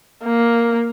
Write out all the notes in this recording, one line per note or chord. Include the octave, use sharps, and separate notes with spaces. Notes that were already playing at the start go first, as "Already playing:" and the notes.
A#3